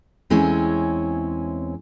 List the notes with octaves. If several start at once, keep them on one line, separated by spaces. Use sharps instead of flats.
E2 G#3 C4 C#4 E4 C#5